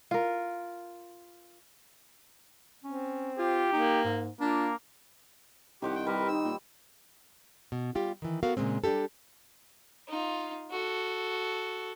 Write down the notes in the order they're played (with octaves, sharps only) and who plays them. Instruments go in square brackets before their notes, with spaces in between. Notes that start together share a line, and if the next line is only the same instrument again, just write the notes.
[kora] F4 A#4
[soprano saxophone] C4 [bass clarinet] C#4
[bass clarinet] F4 [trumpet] G4
[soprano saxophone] A#3 [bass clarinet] D#4
[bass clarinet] G#2
[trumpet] A#3 [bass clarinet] D4 [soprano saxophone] F4
[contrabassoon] C2 [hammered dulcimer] D#3 C5 F#5 [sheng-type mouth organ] G4
[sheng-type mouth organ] G5
[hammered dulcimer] G3 [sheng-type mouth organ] A#4 B4
[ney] D#4 [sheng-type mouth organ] E6
[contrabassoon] A#2
[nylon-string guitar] B2
G3 F4 G4
D#3 E3
B3 F#4 A4 A#4 F5
A#2 C#3 G#3 C4
G3 D4 D#4 G4 A4
[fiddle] D#4 F4
F#4 A4